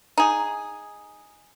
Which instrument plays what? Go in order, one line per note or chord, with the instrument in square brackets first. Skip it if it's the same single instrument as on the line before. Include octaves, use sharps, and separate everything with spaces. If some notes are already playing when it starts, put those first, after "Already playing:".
[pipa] D#4 G#4